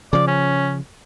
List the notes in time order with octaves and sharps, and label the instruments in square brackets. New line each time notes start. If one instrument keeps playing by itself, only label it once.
[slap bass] C#3 F3 [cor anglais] D5
[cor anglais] C#4